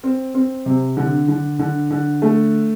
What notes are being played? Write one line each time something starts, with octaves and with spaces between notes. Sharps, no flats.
C4
C4
C3
D3
D3
D3
D3
A3